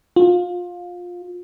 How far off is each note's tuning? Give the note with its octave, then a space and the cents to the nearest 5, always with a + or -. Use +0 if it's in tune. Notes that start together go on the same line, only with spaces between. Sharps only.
F4 +20